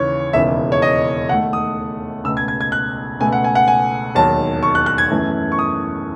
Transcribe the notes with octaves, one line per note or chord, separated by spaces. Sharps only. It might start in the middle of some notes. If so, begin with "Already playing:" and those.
Already playing: D#2 C#3 E3 C#5
E1 D#2 C#3 E3 E5
C#5
D#5
D#2 D#3 A3 F#5
D#6
C#2 B2 A3 E6
G#6
G#6
G#6
F#6
C#2 B2 A3 G#5
F#5
G#5
F#5
G#5
E1 D#2 D#3 F#3 A5
C#6
F#6
F#6
G#6
F#2 E3 A3
C#6
D#6